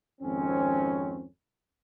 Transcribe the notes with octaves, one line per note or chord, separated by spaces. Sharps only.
G#1 F2 C4 C#4